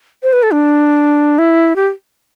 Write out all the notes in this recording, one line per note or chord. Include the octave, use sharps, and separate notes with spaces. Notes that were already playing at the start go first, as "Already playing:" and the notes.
C5
B4
A4
D4
E4
G4